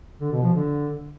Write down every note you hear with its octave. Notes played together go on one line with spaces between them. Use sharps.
D3
B2
F3
D3